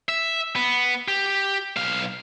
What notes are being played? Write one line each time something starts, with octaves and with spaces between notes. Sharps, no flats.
E5
B3
G4
B1 F5